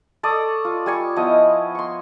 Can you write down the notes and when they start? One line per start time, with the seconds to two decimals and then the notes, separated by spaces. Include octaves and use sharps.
0.23 A4 D5 C#6 D#6
0.65 F4
0.86 G3 G#5 C#6
1.16 F3 B3 E4 D#5
1.75 C6 C#6